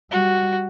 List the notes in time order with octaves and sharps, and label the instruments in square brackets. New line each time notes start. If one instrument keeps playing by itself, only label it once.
[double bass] G3 [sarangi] F#4